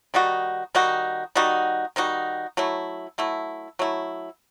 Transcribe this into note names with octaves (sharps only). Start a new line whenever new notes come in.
D#3 G3 D#4 F#4
D#3 G3 D#4 F#4
D#3 G3 D#4 F#4
D#3 G3 D#4 F#4
F#3 A3 E4
F#3 A3 E4
F#3 A3 E4